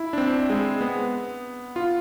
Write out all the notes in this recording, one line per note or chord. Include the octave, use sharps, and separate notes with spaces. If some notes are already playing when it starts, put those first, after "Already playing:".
Already playing: E4
D4
C4
G#3
B3
F4